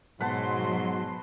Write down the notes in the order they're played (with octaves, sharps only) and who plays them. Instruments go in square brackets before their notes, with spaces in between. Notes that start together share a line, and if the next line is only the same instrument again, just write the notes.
[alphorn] G#2 [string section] B2 C6 [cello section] F#3 [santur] B4 F#5 A5